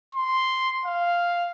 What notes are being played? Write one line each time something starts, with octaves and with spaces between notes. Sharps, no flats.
C6
F5